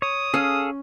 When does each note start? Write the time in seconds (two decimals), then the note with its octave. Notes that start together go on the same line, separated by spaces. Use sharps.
0.02 C#5 D#6
0.34 C#4 G#4 A4 F5